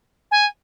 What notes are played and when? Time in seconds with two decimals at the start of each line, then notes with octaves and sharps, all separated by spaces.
0.31 G#5